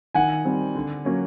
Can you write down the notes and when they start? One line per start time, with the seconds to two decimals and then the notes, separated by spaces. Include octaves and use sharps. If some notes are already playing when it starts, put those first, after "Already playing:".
0.15 D#3 F#5 G#5
0.45 G3 C4
0.75 D3
1.05 F#3 A#3 C#4